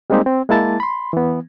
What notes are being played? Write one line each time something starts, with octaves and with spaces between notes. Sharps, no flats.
G3 G#3 A#3 C4 D#4 G4
C4
G#3 A#3 E4 A5 A6
B5 C6
E3 B3